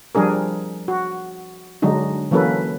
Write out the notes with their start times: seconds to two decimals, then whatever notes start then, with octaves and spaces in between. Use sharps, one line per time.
0.15 F3 G3 D4 G#4 A#4
0.88 F#4
1.82 D3 F#3 G#3 D4 D#4
2.31 E3 F#3 A#3 C#4 A4 B4